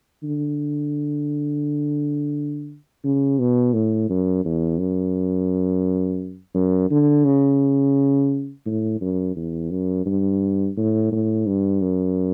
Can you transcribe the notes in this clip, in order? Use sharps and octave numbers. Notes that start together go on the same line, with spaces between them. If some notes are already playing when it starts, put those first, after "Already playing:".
D3
C#3
B2
A2
F#2
E2
F#2
F#2
D3
C#3
A2
F#2
E2
F#2
G2
A2
A2
G2
F#2